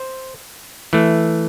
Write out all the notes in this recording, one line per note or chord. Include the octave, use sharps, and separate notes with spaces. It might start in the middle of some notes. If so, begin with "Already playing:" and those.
Already playing: C5
E3 A3